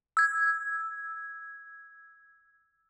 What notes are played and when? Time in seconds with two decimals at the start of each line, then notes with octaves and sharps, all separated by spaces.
0.17 E6 G#6